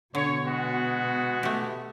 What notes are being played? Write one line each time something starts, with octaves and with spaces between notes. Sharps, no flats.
B2 D3 C#5
G#3 B3 F#4
A3 G4